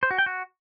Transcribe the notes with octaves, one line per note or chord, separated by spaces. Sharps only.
C5
F#4
G5
F#4